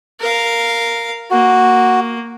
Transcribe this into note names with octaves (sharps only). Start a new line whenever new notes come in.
A#4 F5
A#3 F#4